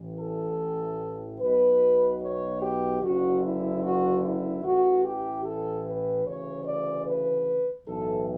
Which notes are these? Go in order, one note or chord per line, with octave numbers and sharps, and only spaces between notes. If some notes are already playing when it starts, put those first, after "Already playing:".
Already playing: A1 A2 E3
A4
B1 B2 B4
C#5
G4
F#1 F#2 D3 F#4
E4
F#4
E4
A1 A2 E3 F#4
G4
A4
B4
D2 C#3 E3 C#5
D5
B4
B1 A2 E3 A4